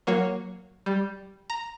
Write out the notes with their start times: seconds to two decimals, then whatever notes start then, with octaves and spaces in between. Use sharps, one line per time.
0.07 F#3 A#3 F#4 C#5
0.86 G3
1.50 A#5